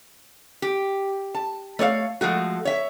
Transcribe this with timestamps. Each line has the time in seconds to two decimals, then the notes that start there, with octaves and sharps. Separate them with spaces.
0.62 G4
1.35 A5
1.79 A3 C#5 D5 F5
2.21 F3 G#3 A3 F#4
2.65 C#5 E5